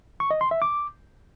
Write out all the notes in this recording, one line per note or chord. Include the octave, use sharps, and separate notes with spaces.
C#6
D#5
C6
E5
D6